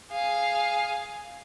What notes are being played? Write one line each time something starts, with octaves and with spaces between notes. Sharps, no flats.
G#4 F5